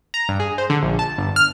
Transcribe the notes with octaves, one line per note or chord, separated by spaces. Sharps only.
A#5
G2
G#4
C5
D3
A#1
A5
G1
F6